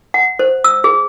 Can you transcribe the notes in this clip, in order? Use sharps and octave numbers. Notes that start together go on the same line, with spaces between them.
F#5
C5
E6
G#4